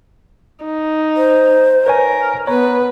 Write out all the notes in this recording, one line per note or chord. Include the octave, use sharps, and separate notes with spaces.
D#4
C5
A#4 B4 C#5 G#5
B3 B4 C#5 A#5